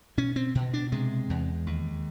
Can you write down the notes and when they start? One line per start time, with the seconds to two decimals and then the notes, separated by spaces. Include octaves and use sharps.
0.18 B2 C#4
0.36 C4
0.55 B2
0.74 D4
0.92 C3 G#3
1.30 E2
1.66 D#2